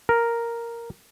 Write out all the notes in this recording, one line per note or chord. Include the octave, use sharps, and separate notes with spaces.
A#4